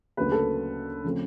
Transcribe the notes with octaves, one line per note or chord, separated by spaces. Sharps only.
D2 C#3 F#3 A#3 B4
A4
C#3 F3 A3 C4